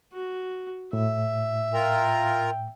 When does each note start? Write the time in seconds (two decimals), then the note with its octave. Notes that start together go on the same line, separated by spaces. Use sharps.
0.13 F#4
0.93 A2 E5
1.74 F4 A#4 G5 A#5